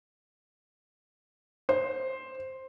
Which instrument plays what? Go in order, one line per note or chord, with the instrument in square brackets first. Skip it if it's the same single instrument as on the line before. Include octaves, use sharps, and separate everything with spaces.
[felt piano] C5